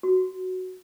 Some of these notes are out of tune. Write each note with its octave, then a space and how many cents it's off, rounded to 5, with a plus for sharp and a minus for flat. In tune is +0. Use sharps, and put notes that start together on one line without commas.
F#4 +0